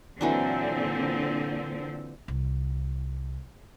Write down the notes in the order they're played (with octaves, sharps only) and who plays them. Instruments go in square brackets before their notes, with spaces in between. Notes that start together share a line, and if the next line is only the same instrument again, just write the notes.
[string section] A#2 D3 C4 [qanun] E3 F#3 D4
[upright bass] C2